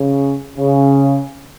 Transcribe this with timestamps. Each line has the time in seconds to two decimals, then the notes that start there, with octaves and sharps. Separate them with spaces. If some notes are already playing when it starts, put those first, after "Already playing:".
Already playing: C#3
0.58 C#3